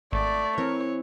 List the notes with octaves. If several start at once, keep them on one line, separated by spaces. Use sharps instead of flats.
G#1 A3 D5
E3 C4 A#4 C#5